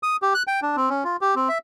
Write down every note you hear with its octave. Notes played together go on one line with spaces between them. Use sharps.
D#6
G4
F#6
G5
D4
C4
C#4
F4
G4
C4
E5